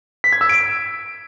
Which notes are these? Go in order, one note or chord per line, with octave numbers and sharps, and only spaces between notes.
B6
G#6
E6
D7